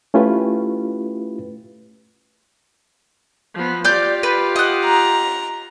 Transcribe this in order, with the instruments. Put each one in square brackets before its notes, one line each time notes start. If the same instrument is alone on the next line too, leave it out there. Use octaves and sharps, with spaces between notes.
[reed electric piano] A3 C#4 E4 F4 G4 B4
[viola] F3 B3
[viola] F4 G4 [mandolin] D5 G6
[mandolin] B4
D#5 F#5
[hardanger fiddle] A#5